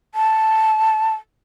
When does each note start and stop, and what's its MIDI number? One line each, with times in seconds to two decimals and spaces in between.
0.15 1.14 81